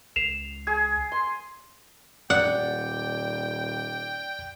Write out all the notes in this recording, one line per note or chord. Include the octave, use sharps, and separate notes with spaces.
C#2 C7 E7 F7
G#4 G#6
C6
D#1 D5 F#5 G5